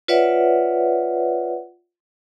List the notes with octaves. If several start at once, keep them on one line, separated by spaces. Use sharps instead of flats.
F4 B4 C#5 D5 E5 F#5